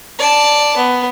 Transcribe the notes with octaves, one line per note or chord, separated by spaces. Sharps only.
D5 A5
B3